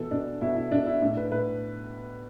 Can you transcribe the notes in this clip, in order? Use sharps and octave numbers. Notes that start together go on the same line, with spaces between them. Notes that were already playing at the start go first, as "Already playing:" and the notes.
Already playing: B2 E3 A4
B2 D4
B2 E4
E4
B2 D4
E4
A2 D4
B4
A2 B4